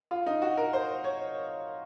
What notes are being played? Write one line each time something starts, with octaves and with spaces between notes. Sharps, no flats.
F4
D#4
F#4
A#4
C5
C#5